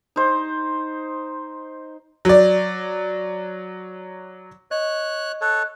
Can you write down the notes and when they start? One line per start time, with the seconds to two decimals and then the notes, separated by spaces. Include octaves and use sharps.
0.16 D#4 C5
2.25 F#3 D5
4.71 C#5 D#5 F#6
5.41 A4 C#5 F#6